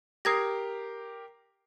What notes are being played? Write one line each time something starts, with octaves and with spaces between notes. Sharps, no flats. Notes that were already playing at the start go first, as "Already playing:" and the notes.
G4 A#4 D#6 G#6 A#6 C7